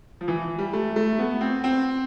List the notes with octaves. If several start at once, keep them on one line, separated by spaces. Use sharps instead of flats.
F3
E3
G3
A3
A3
B3
C4
C4